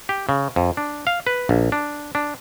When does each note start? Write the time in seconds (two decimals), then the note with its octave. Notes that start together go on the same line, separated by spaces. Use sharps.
0.09 G4
0.29 C#3
0.56 F2
0.77 D4
1.07 F5
1.27 B4
1.49 A#1
1.72 D4
2.15 D4